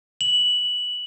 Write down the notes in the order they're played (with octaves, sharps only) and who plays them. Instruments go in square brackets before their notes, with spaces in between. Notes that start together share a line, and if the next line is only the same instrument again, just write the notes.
[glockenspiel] F#7